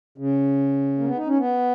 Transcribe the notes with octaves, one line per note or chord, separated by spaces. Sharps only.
C#3
A#3
B3
D#4
C#4
B3